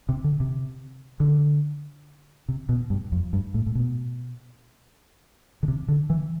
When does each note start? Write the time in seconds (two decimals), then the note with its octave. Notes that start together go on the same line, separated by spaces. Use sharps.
0.09 C3
0.24 D3
0.40 C3
1.20 D3
2.48 C3
2.69 B2
2.90 G2
3.12 F2
3.33 G2
3.54 A2
3.66 A2
3.75 B2
5.63 D3
5.68 C3
5.88 D3
6.10 E3